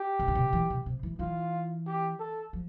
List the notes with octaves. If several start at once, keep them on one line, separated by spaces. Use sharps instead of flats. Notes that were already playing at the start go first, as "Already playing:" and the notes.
Already playing: G4
C3
D3
C3
E3
C3
C3
E3
E3 F4
G4
A4
F3